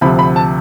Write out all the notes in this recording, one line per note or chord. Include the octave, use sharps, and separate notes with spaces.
D2 C3 F3 B5
B5
A5